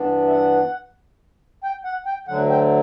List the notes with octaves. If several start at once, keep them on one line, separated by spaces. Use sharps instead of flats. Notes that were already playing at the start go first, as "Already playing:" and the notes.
Already playing: G2 E3 B3 D4
E5
F#5
G5
F#5
G5
D2 D3 F#3 F#5
G5